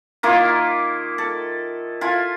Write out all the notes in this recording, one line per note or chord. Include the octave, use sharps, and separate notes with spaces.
D#3 A#3 E4 F4
A4
E4 F4 A4 G#5